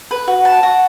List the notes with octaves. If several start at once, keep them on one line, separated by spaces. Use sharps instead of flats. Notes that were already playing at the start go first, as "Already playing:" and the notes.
B4
F#4
A5
F#4